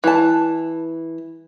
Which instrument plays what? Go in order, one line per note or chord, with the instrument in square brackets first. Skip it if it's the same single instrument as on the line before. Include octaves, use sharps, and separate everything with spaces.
[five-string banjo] E3 A5